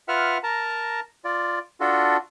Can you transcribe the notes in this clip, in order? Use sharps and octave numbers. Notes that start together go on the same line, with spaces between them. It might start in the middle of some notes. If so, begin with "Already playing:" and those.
F4 B4 E5 F#5 F6
A#4 A5 A#5
F4 D5
D4 F4 F#4 A4